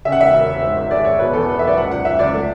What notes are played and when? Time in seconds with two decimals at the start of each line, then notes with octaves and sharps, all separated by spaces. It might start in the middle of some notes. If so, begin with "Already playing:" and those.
0.05 C#3 E5
0.12 F#5
0.19 E1 E5
0.34 E1
0.48 E1
0.62 G#2
0.76 G#1
0.91 G#3 D5
1.05 G#1 C#5
1.19 B2 B4
1.33 E2 A4
1.48 E2 B4
1.59 E5
1.63 F#1 D5
1.77 C#2 F#5
1.91 C#2 F#5
2.05 C#2 E5
2.19 C#2 D5
2.33 A3